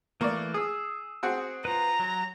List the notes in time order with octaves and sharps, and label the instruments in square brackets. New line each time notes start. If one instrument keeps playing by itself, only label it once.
[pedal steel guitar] E3 A3 C#6 [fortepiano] A#3 D5
[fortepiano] G#4 [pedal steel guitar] D#6 E6
[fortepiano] C4 F#4 G#4
[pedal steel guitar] F4 B4 [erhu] A#5
[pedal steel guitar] F#3